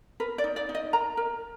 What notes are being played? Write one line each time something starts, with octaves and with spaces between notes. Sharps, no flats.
A#4 B4
D5
D#4
D5
D#4
D#5
A#4 A#5
A#4